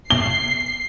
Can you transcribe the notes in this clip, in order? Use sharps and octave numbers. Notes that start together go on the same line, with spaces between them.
C7 G7